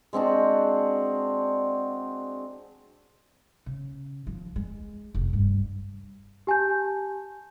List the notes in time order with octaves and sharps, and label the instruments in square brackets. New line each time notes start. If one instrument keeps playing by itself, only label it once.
[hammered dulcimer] G#3 C4 D4 F#4
[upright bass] C#3
F3
G#3
F1
G2
[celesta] G4 G#5 A5 G6